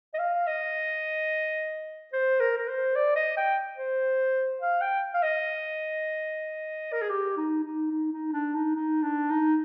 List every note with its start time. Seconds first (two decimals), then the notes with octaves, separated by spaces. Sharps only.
0.14 D#5
0.19 F5
0.47 D#5
2.13 C5
2.40 A#4
2.58 A#4
2.68 C5
2.95 D5
3.16 D#5
3.37 G5
3.77 C5
4.61 F5
4.81 G5
5.14 F5
5.22 D#5
6.93 A#4
7.02 G#4
7.10 G4
7.37 D#4
7.64 D#4
7.91 D#4
8.13 D#4
8.33 D4
8.55 D#4
8.75 D#4
9.02 D4
9.30 D#4